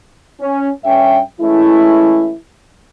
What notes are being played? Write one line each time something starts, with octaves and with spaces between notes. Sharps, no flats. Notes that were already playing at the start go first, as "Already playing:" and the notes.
C#4
G2 C#4 E5 G5
E3 G#3 A3 C#4 E4